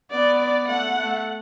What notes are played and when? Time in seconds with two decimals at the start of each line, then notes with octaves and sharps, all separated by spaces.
0.11 B3 D5
0.40 D5
0.68 A3 F#5
0.97 A3